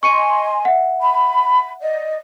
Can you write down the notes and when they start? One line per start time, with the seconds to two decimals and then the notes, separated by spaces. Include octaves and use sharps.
0.03 D#5 G#5 C6 C#6 C#7 D#7
0.65 E5 F#5
1.01 B5
1.81 D5 D#5